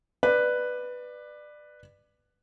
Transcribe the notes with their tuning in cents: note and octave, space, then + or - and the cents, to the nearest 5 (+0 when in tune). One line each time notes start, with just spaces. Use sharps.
B4 +0 D5 +20